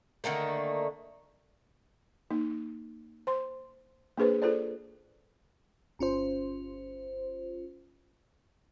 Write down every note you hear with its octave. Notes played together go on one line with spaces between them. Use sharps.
D3 D#3 A3 A#3
A#3 D#4
C5 C6
A#3 D4 G#4 B4 C5
F4 A4 C5 D5
G1 C#4 F4 C5